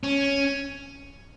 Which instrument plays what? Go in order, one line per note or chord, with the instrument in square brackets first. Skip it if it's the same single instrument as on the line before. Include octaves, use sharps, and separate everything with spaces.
[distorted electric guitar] C#4